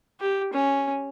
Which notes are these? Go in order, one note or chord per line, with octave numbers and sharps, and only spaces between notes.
G4
C#4